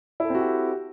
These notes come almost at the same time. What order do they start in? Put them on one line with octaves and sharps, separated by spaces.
E4 A4 C4 F#4 G4